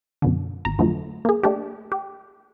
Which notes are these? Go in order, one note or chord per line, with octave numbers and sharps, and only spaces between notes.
F#2 B2 D3
G#1 A#5
F2 D3 F3 F#3 A3
A#3 G#4
A3 D4 G4
G4